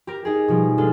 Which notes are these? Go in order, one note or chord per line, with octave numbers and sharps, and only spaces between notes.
G4 A#4
D#4 G4 G#4
B2 F3 G3
G#3 D4 F4 G#4 A4